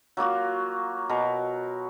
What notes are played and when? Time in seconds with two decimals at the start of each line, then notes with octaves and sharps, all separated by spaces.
0.17 F#3 A#3 F4 F#4
1.09 B2 A#4